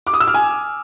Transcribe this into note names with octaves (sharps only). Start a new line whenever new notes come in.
D6
D#6
E6
F6
G#5